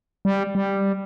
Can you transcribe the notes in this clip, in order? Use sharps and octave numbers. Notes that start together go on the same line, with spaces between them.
G3
G3